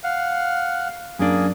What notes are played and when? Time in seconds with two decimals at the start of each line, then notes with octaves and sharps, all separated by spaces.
0.04 F5 F#5
1.19 F#2 A#3 D4 G#4